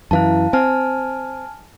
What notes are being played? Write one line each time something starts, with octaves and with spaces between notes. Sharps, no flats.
F#2 E3 E4 F5 A5
C4 G#5 A5 F6